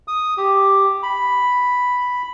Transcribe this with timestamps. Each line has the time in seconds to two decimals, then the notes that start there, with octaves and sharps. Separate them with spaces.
0.08 D#6
0.37 G4
1.03 B5